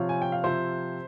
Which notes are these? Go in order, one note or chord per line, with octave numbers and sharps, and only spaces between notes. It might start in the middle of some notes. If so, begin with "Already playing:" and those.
Already playing: C3 F3 C4 F4 C#5 F5
G#5
G5
F5
C3 F3 C4 F4 C5 E5